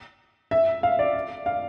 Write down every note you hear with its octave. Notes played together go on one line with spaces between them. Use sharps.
E5
F5
D5
F5